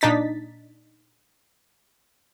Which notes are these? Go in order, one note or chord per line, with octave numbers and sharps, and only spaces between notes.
A#2 D4 D#4 A6 B6